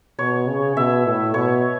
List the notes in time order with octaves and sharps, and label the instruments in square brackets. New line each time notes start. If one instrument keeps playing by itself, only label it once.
[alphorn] B2 [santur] C#5
[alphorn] C#3
[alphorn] B2 [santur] E5
[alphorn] A2
[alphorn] B2 [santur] C#5